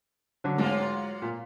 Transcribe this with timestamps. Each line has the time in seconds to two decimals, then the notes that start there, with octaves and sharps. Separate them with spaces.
0.44 D3 F#3
0.58 G#2 F#3 G#3 A#3 F4
1.22 A#2